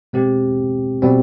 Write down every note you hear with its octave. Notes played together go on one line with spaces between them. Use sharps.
B2 G#3 C4 G4
B2 G3 C4